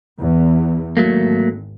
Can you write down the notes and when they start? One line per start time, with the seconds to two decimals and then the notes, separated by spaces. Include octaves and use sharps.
0.19 E2
0.97 G#1 F#3 A3 A#3